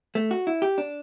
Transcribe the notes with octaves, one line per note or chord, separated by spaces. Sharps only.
A3
F#4
E4
G4
D4